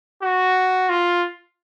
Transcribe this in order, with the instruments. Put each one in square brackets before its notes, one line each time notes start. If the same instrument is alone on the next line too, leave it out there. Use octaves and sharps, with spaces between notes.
[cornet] F#4
F4